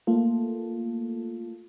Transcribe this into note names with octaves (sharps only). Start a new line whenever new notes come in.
A3 A#3 F4 A4